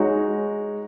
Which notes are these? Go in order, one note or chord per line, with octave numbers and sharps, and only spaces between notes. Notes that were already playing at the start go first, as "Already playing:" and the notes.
Already playing: G#3 D#4 F#4 C#5